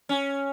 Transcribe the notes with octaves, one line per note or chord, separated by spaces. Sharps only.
C#4